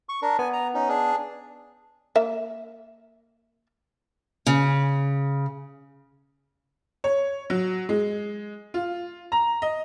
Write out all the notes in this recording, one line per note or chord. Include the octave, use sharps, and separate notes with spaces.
C#6
D4 A#4
B3 G#5
A#5
C#4 D#4
D4 G#4
A#3 E5
C#3
C#5
F#3
G#3
F4
A#5
D#5